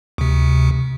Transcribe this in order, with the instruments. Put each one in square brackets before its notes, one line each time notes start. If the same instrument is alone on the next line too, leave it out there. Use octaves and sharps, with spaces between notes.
[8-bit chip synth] D2 C3